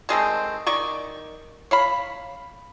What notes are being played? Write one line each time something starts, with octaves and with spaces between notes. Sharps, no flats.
D#3 G#3 A3 C4
D#3 D5 C#6
C#5 F5 B5